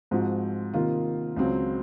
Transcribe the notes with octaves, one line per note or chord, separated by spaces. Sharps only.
G#2 F3 C4 F#4
C3 D#3 A#3 F4
C#2 C#3 F#3 C4